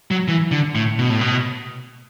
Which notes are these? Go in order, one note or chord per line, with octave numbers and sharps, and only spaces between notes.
F#3
E3
D3
A2
B2
A2
B2